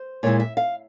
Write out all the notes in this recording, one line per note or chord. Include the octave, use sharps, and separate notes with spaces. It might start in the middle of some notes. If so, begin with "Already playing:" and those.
Already playing: C5
A#2 G#3 E4 C#5
E5
F5